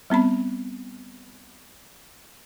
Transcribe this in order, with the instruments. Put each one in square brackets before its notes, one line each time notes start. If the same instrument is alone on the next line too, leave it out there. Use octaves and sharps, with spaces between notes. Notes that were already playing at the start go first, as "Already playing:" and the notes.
[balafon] G3 B3 C4 B5